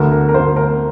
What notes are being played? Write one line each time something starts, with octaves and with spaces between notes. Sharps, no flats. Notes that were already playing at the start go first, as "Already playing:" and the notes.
Already playing: D2 D3 A#4
A#4
A#4
D2 D3 C5
A#4